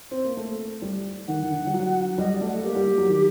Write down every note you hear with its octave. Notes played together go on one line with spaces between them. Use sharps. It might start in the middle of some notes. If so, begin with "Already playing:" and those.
C4
A#3
A3
G3
D#3 F#5
D#3
D3
G3
F#3
G3 D#5
D5
A3
F#5
A#3 G4
G3
G3
F#3
D#3